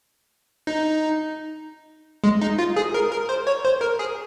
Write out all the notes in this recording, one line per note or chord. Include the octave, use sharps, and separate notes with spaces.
D#4
G#3
D#4
F4
G#4
A#4
A#4
C5
C#5
C5
A#4
G#4